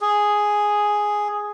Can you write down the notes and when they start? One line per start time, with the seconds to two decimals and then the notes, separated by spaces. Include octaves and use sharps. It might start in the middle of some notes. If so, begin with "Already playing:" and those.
0.01 G#4